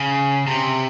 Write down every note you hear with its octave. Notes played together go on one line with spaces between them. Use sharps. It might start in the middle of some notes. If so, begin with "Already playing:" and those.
Already playing: C#3
C3